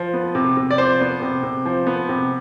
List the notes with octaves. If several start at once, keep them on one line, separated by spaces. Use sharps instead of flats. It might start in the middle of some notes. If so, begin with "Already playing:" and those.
Already playing: F3
B3
C3
C3
D5
F3 C5
B3
C3
C3
F3
B3
C3